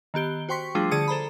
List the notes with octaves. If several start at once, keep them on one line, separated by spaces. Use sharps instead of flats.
D#3 B3 G4 G7
F#4 C5 G5 C6 C#6 B6
F3 G3 A3 D4 F4 G#4
D3 G#4 A5 D#6 C#7
A4 C5 A#5 B5